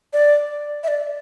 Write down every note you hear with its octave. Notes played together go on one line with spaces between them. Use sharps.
D5
E5
D5